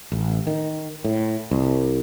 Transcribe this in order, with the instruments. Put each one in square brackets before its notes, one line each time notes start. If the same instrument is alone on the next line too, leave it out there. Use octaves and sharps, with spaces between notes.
[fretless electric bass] A1
D#3
A2
C2